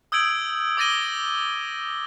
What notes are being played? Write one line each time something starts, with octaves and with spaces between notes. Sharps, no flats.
D#6 E6 G6 G#6 D7 F#7
D6 D#6 A6 A#6 D#7 G7